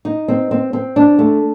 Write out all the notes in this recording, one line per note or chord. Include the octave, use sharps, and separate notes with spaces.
D#4
C4
C4
C4
D4
A3